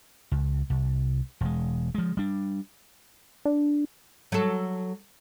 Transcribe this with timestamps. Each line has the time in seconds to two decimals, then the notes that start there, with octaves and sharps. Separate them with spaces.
0.32 C#2
0.70 C2
1.41 E1 G#3
1.95 F3 G#3
2.17 G3 D4
3.45 D4
4.32 F#3 A4